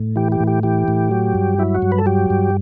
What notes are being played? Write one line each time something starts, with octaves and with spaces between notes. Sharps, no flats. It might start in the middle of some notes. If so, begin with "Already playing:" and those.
Already playing: A2
E3 G4
G4
A2
G4
E3 G4
A2
F#3
G2
F#3 E4
F#4
G2
B4
A4
F#3 G4
G2